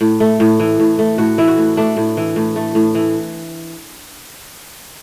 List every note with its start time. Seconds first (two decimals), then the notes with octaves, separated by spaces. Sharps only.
0.01 A2
0.20 A3
0.40 A2
0.59 E3
0.80 A2
0.99 A3
1.18 A2 F#4
1.38 E3 E4
1.48 F#4
1.58 A2
1.77 A3 D4
1.97 A2
2.17 E3
2.36 A2
2.56 A3
2.75 A2
2.95 E3